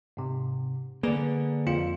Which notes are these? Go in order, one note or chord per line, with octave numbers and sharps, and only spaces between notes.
G#2 C3
D3 A#3 G#4 B4 D5
F2 F4 C#7